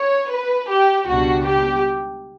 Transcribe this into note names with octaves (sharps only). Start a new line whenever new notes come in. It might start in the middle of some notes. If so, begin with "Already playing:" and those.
Already playing: C#5
B4
G4
C#2 B2 G3 D4 F#4
G4